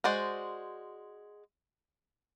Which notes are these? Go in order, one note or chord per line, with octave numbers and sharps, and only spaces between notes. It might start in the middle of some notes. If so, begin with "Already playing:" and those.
G#3 F#4 C5 D5